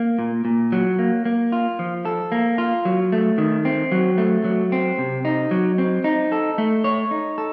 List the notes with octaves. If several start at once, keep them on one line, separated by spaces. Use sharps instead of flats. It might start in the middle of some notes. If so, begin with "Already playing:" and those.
Already playing: A#3
A#2
A#2
F#3
A#3
A#3
F4
F3
A4
A#3
F4
F#3
A3
D#3
C4
F#3
A3
F#3
C4
C3
D#4
F#3
C4
D#4
A4
A3
C#5
D#4
A4